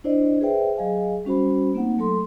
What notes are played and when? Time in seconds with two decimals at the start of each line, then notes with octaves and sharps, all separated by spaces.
0.04 D4 E4 C5 D5 D#5
0.41 G#4 B4 C5 D5 E5 G5
0.77 F#3 G#4 D#5 F5 G#5
1.25 G3 C#4 F#4 C5 B5
1.73 A3 A#3 C4 D#4 F#5
1.98 F#3 A3 A4 C6